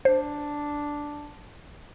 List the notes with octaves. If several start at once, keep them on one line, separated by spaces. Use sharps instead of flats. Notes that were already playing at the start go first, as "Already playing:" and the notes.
D4 C5